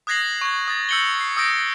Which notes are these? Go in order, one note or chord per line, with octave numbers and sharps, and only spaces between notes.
D#6 F#6 G#6 A#6 C7 F#7
C#6 G#6
D#6 A6
E6 G6 C#7 F#7 G7
C7
D#6 E6 G6 A#6 D7